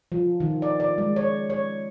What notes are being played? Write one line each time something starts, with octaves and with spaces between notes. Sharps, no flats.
F3
D#3
D5
D5
G#3
C#5
C#5